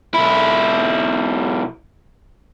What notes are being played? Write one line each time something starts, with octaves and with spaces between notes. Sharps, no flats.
B1 E4